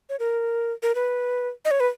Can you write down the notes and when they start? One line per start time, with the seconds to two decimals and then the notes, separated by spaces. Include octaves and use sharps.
0.09 C#5
0.19 A#4
0.83 A#4
0.95 B4
1.65 D#5
1.71 C#5
1.80 B4